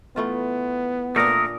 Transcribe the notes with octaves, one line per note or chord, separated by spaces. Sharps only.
E3 A3 B3 F4
A#2 A3 D4 A#4 D#6